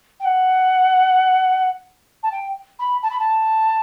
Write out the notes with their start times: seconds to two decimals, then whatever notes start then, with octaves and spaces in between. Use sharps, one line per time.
0.20 G5
0.25 F#5
2.23 A5
2.32 G5
2.79 B5
3.03 A5
3.11 B5
3.20 A5